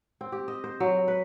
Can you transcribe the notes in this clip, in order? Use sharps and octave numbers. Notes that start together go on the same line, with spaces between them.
C4
G4
D#5
C5
F#3
B4